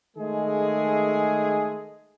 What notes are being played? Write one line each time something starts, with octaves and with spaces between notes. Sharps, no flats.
D#3 G#3 A3 G#4